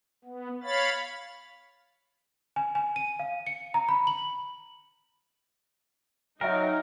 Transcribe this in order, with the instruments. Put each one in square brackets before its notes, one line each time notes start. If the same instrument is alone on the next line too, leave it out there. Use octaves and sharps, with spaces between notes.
[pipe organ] B3
C#5 F5 B5 A6
[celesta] G#5
G#5
D#7
F5
C#7
A#5
B5
F#7
[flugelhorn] F#3 [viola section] D#4 [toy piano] F#4 E5 G5 [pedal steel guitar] A#4